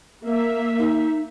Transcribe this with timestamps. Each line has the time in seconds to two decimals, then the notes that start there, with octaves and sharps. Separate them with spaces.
0.24 A#3 E5
0.78 D#4